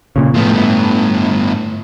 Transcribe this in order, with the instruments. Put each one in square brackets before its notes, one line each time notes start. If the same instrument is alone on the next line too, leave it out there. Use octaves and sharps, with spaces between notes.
[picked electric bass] A#2 C#3
[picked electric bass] A2 [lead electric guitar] F3 B3
[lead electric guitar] G2 B3